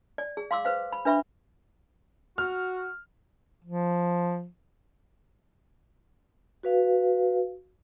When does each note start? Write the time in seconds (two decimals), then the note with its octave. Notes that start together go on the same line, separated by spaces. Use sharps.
0.18 D5
0.37 G#4
0.51 F5 C6 D6 E6
0.65 B4 C5 F5
0.92 B5
1.05 D4 B4 E5 B5 C#6
2.38 F#4 F6
3.64 F3
6.63 F#4 B4 F5